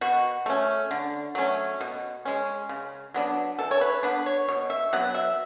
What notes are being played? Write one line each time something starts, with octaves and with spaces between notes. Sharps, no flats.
B2 F#4
A3 C#4
D3
F#3 A3 C#4
B2
G#3 C#4
C#3
F#3 B3 D4
E3 A4
C#5
B4
B3 D4 B4
C#5
B2 C#5
E5
F#3 B3 F#5
E5